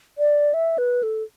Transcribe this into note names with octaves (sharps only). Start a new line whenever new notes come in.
D5
E5
B4
A4